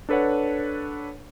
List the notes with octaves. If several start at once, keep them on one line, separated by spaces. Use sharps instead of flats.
D4 A4 B4 C#5 F#5